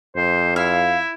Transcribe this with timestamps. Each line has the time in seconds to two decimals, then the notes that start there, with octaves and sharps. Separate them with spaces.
0.16 F2 C5
0.56 E4 F5